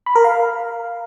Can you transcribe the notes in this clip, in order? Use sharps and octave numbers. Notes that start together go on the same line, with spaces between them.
B5
A#4
F5